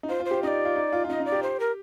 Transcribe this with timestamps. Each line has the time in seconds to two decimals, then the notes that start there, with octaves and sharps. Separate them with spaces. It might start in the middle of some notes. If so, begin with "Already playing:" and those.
0.03 D#4
0.09 F4 C5
0.20 F4
0.25 C5
0.31 G4
0.43 D#4 D5 D#5
0.65 F4
0.76 D#4
0.92 F4
1.05 F4
1.09 D#4 D#5
1.20 D#4
1.26 D5
1.32 G4
1.43 C5
1.60 A#4